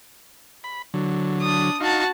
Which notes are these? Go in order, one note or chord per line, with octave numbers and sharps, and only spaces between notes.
B5
D3 F#3
D4 D#6
D#4 F#4 F5 A5